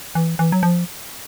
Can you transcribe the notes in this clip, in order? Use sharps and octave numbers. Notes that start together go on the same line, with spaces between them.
E3
E3
F#3
F3